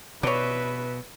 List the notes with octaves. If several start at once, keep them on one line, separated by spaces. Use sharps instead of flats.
B2 B4 C#5 D5 E5